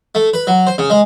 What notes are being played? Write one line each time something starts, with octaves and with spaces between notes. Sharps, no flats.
A3
B4
F#3
C5
C#3
G#3